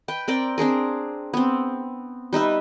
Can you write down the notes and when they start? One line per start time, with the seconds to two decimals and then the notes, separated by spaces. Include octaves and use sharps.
0.08 B4 G5
0.28 C4 A#4 D5 G5
0.58 C4 D4 G#4 A#4
1.33 B3 C4
2.33 G3 D#4 B4 E5